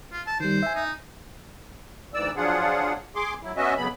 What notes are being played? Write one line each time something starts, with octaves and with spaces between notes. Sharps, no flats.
F4
A5
D#3 G3 C5
E5 G#5
D#4
D2 G#2 E3 D5 E6
F3 F#3 D4 F4 G#4 F#5
G#4 C6 D6
F#3 E4
B3 C#4 F#4 D#5 E5
F2 C#3 F#3 B3 B5